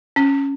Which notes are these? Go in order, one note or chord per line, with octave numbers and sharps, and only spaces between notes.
C#4